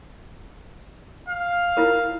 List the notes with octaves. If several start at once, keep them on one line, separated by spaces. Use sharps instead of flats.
F5
E4 F4 A#4